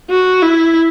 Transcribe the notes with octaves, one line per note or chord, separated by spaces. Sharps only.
F#4
E4